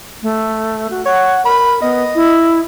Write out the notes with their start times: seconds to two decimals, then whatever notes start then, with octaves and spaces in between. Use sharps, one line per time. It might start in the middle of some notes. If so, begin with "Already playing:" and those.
0.23 A3
0.91 F#4
1.06 C#5 F#5
1.45 A#4 B5
1.82 B3 D#5
2.15 E4